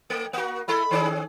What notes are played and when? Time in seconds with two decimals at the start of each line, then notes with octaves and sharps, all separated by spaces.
0.10 A3
0.33 A#3 F#4
0.68 G#3 E4 A4 B5
0.91 D#3 C#4 G#4